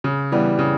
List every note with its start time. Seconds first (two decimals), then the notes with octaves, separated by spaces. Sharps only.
0.04 C#3
0.32 E3 G3 B3
0.59 C#3